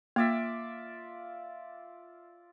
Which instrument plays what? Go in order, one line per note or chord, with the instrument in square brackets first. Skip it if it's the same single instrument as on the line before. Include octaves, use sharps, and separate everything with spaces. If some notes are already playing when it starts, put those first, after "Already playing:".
[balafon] A#3 [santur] F4 D5 E5